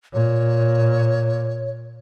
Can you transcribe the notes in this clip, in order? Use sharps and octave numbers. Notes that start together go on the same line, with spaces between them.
A#2 C#5